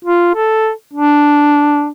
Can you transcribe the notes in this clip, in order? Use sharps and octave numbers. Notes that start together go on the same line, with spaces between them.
F4
A4
D4